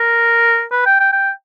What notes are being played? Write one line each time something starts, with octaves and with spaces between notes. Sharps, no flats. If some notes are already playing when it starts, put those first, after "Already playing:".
Already playing: A#4
B4
G5
G5
G5